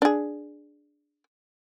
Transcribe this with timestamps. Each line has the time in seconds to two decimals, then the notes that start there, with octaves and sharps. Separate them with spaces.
0.02 D4 G#4